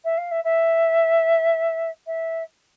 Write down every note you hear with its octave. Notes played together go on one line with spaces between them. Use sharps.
E5
F5
E5
E5
E5